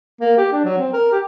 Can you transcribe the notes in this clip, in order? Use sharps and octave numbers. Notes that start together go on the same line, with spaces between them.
A#3
G4
D4
F#3
C4
A#4
G4